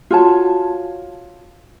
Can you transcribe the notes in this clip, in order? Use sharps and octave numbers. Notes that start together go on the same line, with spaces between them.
F4 F#4 C#5 A5